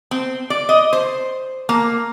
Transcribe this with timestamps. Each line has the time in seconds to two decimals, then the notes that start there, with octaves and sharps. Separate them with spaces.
0.11 C4
0.50 D5
0.69 D#5
0.93 C5
1.69 A#3